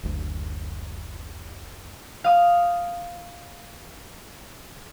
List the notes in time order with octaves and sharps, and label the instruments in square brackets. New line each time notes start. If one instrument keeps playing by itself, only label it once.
[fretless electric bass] F#1 D2
[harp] F5 D#6